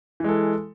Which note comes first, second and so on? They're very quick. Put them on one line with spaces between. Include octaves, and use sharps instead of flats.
E3 G#3 A4